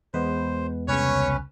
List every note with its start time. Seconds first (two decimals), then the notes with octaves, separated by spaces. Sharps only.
0.14 E2 G#3 B3 B4 C5
0.88 C2 C#3 C#4 B4 C#5